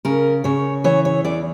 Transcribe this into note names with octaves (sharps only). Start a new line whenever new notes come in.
C#3 A#4
C#3 C#5
E3 C#5
C#5
E2 D5